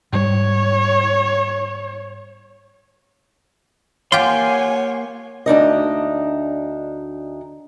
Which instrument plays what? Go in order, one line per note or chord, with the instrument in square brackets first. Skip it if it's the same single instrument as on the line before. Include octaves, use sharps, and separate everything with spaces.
[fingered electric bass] G#2 G3 [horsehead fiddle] C#5
[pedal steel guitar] A#3 C6 [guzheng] F4 G4 [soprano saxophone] C#5 [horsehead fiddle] F#5 G#5
[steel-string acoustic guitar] D2 D4 D#4 D#5